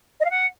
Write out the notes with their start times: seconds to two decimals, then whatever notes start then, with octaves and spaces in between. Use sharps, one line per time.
0.19 D#5
0.25 F5
0.30 F#5